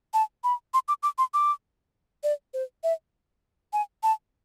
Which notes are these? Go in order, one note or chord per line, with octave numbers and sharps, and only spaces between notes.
A5
B5
C6
D6
D6
C6
D6
D5
C5
E5
G#5
A5